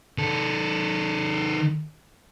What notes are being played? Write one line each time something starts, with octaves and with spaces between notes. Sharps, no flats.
D#3 A4